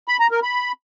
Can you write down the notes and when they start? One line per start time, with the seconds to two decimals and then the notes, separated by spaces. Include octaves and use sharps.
0.08 B5
0.20 A#5
0.31 A#4
0.43 B5